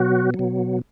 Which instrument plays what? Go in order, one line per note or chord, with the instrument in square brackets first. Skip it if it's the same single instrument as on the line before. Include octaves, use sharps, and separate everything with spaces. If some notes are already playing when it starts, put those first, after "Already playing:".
Already playing: [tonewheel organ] B2 F#3 F#4
F#3
B2